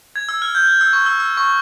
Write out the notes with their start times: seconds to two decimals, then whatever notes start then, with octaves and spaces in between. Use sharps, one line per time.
0.16 G#6
0.29 E6
0.42 F6
0.55 G6
0.68 G6
0.81 E6
0.93 C#6
1.06 E6
1.20 E6
1.37 C#6